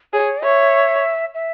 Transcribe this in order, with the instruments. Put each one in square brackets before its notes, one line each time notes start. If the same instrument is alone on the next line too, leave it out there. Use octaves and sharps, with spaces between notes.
[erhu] G#4 [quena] C#5
[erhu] C#5 [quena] E5
[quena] E5